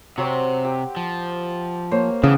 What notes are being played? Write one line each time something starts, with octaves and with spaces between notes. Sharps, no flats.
C3 F#3 C4 D6
G4
F3
A#3 C5 C#5
C#3 E3 B3 D4